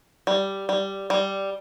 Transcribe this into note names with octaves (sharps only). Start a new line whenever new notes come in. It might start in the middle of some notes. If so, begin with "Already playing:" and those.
G3
G3
G3